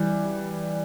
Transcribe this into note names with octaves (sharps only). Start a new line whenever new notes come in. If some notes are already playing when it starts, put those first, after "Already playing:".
Already playing: E3 G3